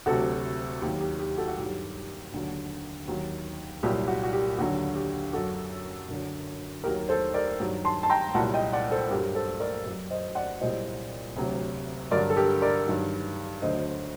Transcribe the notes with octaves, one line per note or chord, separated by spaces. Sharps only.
D2 C3 F#3 F#4 A4
D#2 D#3 F#3 G4
G4
G4
F#4 A4
F#4
G2 D#3 F#3 G4
D#2 D3 F#3
D#2 D#3 F#3
C2 A#2 F#3 G4
F#4
F#4
G4
D#2 D3 F#3 F#4
G4
F#2 F#3 F#4 A4
F#2 D3 F#3
D#2 D#3 F#3 G4 A#4
A4 C5
A#4 D5
G2 D#3 F#3
A5 C6
A5
G5 A#5
C2 A#2 F#3 F#5 A5
D#5 G5
D5 F#5
A4 C5
G2 F#3 G4 A#4
A4 C5
A#4 D5
F#2 F#3
C5 D#5
D5 F#5
C2 A#2 F#3 C5 D#5
D2 C3 F#3
G2 D3 F#3 A#4 D5
A4
G4 A#4
A#4 D5
G2 D#3 F#3
D2 D3 F#3 C5 D#5